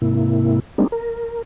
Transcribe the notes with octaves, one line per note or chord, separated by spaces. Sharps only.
G#2 C3 A#3 E4
G3 G#3 A#3 C4 D4 D#4
A#4